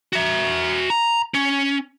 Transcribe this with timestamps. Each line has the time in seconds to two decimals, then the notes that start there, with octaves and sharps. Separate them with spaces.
0.13 F#4 E5
0.90 A#5
1.34 C#4